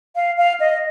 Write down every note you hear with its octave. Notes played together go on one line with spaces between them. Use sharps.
F5
F5
D#5